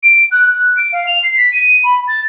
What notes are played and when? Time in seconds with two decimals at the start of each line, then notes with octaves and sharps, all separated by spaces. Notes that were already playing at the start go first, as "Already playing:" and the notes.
0.03 D7
0.31 F#6
0.54 F#6
0.77 D7
0.93 F5
1.07 F7
1.23 C7
1.37 B6
1.53 D#7
1.84 B5
2.08 A6